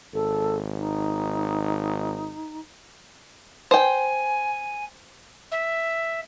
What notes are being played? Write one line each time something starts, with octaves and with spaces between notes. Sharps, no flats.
G#1 A4
D#4
C5 G5 G#5
E5